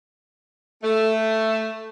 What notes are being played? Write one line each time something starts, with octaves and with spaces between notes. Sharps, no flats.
A3